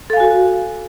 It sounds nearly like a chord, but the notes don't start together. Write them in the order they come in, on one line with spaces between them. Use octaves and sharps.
A4 F5 G#5 F#4